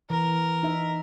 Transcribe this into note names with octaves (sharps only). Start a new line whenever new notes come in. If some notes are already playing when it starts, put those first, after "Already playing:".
E3 A#4
D#4 E5